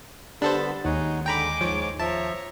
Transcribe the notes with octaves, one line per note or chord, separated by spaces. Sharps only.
D3 G3 B3 D4 A4 C5 B5 A6
D#2 G#3 D#4 C#5 F#5
D3 G#3 G5 A#5 B5 D6
G#2 F3 C#5
F3 C#5 E5 A5 A#5